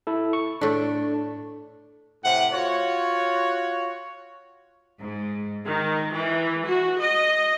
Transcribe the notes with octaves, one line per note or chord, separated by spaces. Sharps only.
E4 A4
C#6
A2 A3 D4
A2 C3 F#5
F4 F#4 C#5
G#2
D#3
E3
F#4
D#5